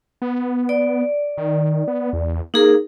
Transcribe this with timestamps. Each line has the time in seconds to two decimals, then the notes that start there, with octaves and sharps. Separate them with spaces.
0.22 B3
0.69 D5
1.38 D#3
1.88 B3
2.13 E2
2.54 A#3 D#4 G#4 A#4